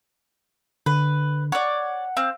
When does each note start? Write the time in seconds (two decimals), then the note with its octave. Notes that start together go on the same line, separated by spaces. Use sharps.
0.86 D3 B4
1.52 C#5 D5 F#5
2.17 C4 F5